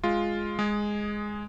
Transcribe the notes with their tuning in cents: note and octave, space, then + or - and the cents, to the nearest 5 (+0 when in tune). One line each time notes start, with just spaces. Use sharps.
G#3 +0 F4 +0
G#3 +0 G#4 +0